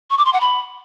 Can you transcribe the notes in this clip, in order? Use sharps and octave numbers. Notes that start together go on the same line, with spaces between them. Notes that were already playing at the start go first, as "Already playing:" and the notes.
C#6
D6
C6
F#5
B5